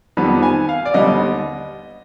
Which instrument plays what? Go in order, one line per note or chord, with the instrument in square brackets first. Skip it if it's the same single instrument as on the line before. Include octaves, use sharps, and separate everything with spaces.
[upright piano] F2 D#3 G3 B3 B5
G#5
F5
D5
D#2 D3 G3 B3 D#5